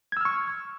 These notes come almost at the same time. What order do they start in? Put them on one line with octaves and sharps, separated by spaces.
G#6 E6 F6 C#6